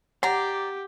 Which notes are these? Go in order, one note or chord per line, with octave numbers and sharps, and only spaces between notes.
G4 D5 F#5 A#5